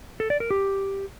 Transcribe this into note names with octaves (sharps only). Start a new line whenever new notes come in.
A4
D5
A#4
G4